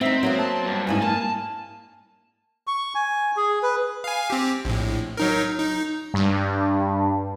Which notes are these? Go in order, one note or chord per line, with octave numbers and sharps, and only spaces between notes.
B3 C4 D#4 E5
F#3 A#3 B3
A5
G2
F2 G#2 E4 G#5
A#3 A5
C#6
G#5
G#4
B4
F5 G#5
C4 G4
A#1 A2
F#3 D#4 A#4
D#4
G2